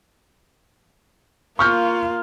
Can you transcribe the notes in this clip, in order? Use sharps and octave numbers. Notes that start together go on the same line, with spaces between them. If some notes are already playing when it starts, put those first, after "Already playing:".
A#3 F4 C#6 F6 G6